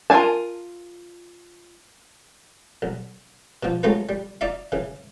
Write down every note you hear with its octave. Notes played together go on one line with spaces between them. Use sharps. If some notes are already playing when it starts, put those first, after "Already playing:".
F4 A#4 F5 G#5 A5
B1
B2 F3
F#3 G#3 A3 C#4 F4 B4
G3
D#4 D5 E5 F5
C#3 E3